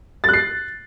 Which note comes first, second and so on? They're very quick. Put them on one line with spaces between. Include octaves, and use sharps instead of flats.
A6 F#6 C7